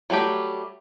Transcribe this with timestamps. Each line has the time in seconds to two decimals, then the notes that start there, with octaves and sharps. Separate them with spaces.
0.10 F#3 G3 A3 G4